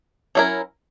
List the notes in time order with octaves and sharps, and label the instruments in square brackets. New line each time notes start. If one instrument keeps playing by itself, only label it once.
[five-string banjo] F#3 C#4 E4 A#4